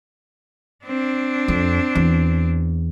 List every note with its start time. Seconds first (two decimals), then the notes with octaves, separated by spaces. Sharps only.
0.85 C4 D4
1.48 F2
1.95 E2